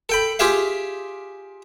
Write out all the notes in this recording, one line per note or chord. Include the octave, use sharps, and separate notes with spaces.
A4 G5 B5
F4 G4 G#4 E5 F5